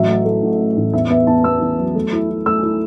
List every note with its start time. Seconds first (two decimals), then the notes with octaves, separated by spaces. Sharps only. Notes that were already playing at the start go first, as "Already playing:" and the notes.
Already playing: A1 F#3 E5
0.09 A3
0.25 A3
0.42 A2
0.60 A3
0.77 A1
0.93 E2 E5
1.10 B3 E5
1.27 E2 A5
1.44 B3 E6
1.61 E2
1.79 F#3
1.95 A3
2.13 E4
2.30 E4
2.46 A3 E6
2.63 E4